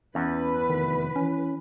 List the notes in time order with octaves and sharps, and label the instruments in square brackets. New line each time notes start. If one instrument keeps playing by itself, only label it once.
[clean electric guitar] E2 [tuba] C#4 [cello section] B4
[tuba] F1 [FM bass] D#3
[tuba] E3 [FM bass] C#4